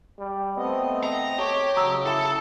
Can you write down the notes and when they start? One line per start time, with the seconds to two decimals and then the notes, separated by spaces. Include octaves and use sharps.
0.19 G3
0.57 A3 B3 C4 D#5
1.03 A#5
1.39 G4 C#5
1.76 C#3 F#3 A#5 D#6 E6
2.06 E4 A4